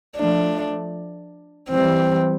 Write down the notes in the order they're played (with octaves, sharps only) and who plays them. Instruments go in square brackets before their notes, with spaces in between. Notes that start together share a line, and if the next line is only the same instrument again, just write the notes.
[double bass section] F3 A3 [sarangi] D4
[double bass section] E3 G3 [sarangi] C4